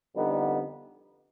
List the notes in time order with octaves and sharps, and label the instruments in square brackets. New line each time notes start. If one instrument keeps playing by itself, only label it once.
[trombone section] F2 D3 G3 B3 D#4